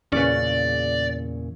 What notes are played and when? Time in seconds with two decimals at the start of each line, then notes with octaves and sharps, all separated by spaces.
0.12 E2 A#2 C#3 C#4 B4 D5